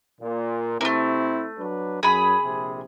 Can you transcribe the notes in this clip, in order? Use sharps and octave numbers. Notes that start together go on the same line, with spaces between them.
A#2
C3 A3 A#3 C4 E4
F#3 D4 B4
F#2 G#4 B5
A#1 C3